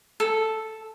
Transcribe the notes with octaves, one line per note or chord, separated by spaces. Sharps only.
A4